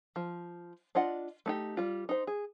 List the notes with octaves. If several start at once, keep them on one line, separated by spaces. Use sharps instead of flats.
F3
D4 F4 D#5 F#5
A3 D#4 G4
G3 F4
D#4 C5
G#4